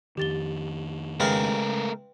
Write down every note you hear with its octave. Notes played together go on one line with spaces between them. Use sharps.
F2 D#3 G4 A6 G7
C#3 G#3 A3 G#4 A#4 B4 G5 F6